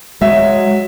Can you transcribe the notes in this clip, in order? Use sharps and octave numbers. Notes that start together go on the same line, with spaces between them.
F#3 G#3 E5